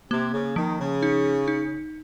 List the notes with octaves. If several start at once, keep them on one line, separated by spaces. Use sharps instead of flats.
C3 A#3
C#3
D#3 F3
C#3
D#4
D#4